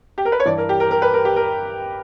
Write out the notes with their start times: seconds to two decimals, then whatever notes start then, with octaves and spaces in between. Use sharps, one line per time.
0.18 G4
0.25 A#4
0.32 B4
0.40 C#5
0.45 G2 E3 D5
0.58 A#4
0.69 G4
0.80 A#4
0.91 A#4
1.02 B4
1.14 A#4
1.25 G4
1.36 A#4